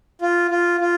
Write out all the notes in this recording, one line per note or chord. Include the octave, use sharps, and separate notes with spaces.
F4
F4
F4